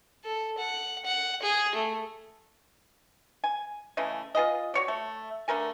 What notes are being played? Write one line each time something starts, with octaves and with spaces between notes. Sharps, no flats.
A4
F#5
F#5
G#4
A3
G#5
C#3 E3 A3 D#5
F4 G#4 B4 D#5
F#4 C#5 D5
A3
D3 A3 A#4 G#5